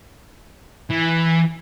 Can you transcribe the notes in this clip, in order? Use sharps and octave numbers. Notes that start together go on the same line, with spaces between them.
E3